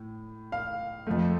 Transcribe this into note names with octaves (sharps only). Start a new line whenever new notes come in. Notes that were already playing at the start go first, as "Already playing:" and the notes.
Already playing: A2
F5
F2 F3 A3